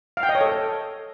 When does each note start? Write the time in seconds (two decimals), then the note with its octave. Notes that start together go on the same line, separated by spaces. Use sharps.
0.17 F5
0.23 G5
0.29 D#5
0.35 C#5
0.41 A4